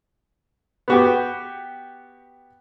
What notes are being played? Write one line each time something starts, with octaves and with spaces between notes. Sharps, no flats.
B3 F#4 G4